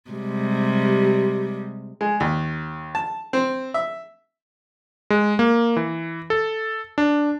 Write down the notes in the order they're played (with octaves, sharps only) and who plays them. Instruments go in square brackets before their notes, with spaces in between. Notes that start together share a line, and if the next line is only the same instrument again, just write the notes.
[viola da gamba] C3 G3 G#3
[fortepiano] G#3
D#2
A5
C4
E5
[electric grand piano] G#3
A#3
E3
A4
D4